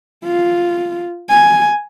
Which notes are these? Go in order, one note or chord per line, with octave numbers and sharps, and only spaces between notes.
F4
G#5